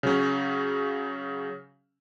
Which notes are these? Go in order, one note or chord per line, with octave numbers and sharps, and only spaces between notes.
C#3 F#3 C#4